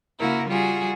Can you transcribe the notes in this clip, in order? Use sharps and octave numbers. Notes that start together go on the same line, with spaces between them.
C#3 A#3 E4 F#4 A#4
G3 F4 F#4 G#4